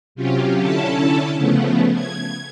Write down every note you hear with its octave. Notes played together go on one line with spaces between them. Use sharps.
C3 F#3 C#4 F4 G4
D3 C#4 E4 A4 A5
C#3 F3 A3 B3
G#6